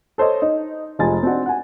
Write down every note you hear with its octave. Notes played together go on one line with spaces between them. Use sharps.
A4 C5 C#5 D#5
D#4
F1 G#3 F4 G#5 A6
C4 D4 D#4 F#4
F#5 G#5